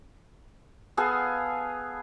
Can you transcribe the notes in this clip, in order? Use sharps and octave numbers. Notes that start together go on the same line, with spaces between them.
B3 G#4 A4 F5